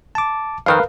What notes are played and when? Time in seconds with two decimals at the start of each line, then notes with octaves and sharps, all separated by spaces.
0.15 A5 D6
0.66 F2 D#3 C4 A#4 B4 F5